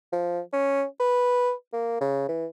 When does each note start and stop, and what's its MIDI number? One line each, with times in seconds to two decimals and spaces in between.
0.12 0.40 53
0.53 0.84 61
1.00 1.52 71
1.73 1.96 58
2.01 2.28 49
2.28 2.46 52